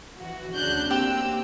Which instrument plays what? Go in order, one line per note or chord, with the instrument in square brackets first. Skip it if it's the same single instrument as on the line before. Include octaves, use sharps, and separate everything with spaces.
[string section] E3 F#4
[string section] D2 C#3 [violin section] D4 F#6 G6
[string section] A#3 C4 [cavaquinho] G4 [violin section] E6